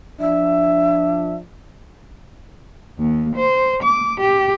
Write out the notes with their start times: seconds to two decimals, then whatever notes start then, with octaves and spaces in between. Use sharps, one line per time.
0.20 F3 D4 E5
2.98 D#2
3.37 C5
3.84 D6
4.22 G4